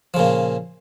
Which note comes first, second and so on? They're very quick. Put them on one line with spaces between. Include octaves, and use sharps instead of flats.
F3 C#3 A#2